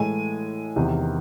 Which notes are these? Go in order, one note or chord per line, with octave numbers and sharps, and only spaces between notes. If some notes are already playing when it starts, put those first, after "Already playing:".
Already playing: A2 E3 G#3 G#5
E2 C3 D#3